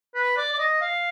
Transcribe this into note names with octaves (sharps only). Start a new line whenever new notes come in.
B4
D5
D5
D#5
F5